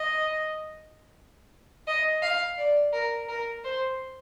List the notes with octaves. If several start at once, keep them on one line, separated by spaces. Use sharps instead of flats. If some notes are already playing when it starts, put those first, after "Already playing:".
Already playing: D#5
D#5
F5
D5
A#4
A#4
C5